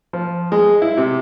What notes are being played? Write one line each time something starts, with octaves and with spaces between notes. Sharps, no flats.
F3
G#3
E4
C3